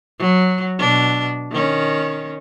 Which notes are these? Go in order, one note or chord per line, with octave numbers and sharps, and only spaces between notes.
F#3
B2 D4
D#3 C#4